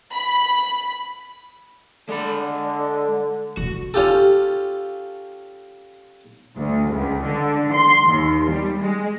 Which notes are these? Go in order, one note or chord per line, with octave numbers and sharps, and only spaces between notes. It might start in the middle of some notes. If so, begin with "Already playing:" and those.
B5
D3 G#3 B5
E1 C#2 F#4
C#4 F4 G4 A4
D2
C#2
D3
C6
D#2
G3
G#3